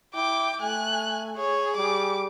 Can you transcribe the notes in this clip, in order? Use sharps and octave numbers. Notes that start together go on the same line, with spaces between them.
E4 G5 D6
A3 G#5 F#6
G#4 C#5
G3 D6